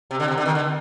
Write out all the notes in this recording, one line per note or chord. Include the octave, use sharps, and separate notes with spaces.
C3
D3
C3
D3
D#3
D3